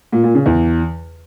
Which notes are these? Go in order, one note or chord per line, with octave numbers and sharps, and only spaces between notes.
A#2
A#2
C#3
E2